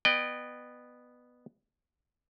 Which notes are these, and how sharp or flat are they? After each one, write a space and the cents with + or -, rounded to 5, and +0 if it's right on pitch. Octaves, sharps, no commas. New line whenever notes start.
B3 +0 D#5 -45 G5 +0